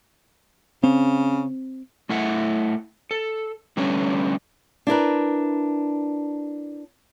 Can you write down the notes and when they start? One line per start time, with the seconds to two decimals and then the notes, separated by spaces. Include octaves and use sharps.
0.83 C#3 C4
2.09 A3 E4 A4 E5 F#5
3.11 A4
3.77 D3 G3 A3 B3 C#4 D4
4.87 D4 E4 A#4 B4